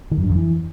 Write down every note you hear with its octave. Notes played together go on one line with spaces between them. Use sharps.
D#3
F#2
G2
F2
E3